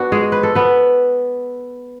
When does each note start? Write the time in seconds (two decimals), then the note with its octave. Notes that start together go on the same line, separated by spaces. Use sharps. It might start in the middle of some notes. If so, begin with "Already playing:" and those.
Already playing: B3 D4 F#4
0.12 G#3 G#4
0.32 B4
0.43 A4
0.55 B3 B4